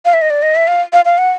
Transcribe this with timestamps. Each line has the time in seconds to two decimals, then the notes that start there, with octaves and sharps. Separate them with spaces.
0.05 F5
0.13 E5
0.22 D#5
0.30 D5
0.43 D#5
0.55 E5
0.68 F5
0.93 F5
1.05 F5
1.18 F#5